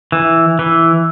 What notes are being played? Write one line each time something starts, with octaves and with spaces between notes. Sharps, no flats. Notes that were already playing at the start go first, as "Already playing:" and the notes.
E3
E3